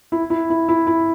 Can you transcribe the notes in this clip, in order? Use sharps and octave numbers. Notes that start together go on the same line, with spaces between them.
E4
E4
E4
E4
E4